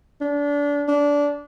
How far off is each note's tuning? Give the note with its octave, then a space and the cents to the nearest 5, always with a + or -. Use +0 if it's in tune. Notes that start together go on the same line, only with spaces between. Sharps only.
D4 -25
D4 -20